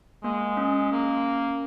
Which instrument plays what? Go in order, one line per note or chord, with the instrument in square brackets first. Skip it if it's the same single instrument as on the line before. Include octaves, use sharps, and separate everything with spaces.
[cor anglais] G#3 [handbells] A#3
[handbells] C#4
[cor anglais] A#3